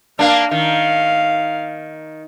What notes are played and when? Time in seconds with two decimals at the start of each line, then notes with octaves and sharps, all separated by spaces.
0.19 A#3 D4 F5
0.51 D#3 F5